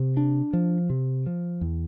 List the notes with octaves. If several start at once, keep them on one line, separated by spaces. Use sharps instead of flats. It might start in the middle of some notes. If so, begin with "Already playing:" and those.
Already playing: C3
D4
F3
C3
F3
E2